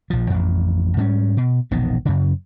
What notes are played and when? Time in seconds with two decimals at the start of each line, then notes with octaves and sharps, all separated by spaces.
0.10 A#1 F3
0.30 A1 F2
0.97 G#2 G3 B3 C#4
1.37 B2
1.71 E1 A#1 D#3 B3
2.05 F#2 C#3